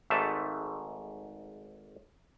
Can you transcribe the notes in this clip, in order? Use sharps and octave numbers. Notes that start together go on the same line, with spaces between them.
G#1 G#2 A3 E5 A5